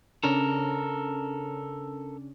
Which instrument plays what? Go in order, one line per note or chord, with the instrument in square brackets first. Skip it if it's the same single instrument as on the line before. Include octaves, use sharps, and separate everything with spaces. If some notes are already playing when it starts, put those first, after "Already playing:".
[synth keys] C#3 C#4 D4 [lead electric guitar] A4 A#4